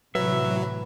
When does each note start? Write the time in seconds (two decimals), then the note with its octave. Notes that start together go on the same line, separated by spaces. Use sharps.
0.15 A2 C3 E3 F#3 B4 E5